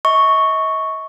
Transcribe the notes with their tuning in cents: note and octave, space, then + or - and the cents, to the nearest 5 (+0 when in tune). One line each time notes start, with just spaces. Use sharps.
D#5 +40 C#6 +0